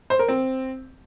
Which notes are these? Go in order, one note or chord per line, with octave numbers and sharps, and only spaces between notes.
C5
A#4
C4